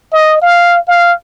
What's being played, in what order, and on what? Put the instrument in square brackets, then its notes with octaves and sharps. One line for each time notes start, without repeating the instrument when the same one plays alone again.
[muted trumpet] D#5
F5
F5